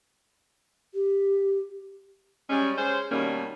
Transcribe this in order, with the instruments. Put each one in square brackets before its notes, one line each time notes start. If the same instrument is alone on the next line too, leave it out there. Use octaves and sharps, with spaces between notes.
[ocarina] G4
[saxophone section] G3 G#3 C#4
G#3 C#4 C5
B2 D#3 G3 A#3 C#4